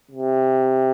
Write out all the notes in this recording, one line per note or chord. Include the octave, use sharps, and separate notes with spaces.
C3